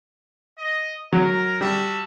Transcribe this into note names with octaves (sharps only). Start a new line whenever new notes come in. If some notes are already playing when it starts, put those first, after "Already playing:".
D#5
F#3 A#4
G3 F#4 E5 A5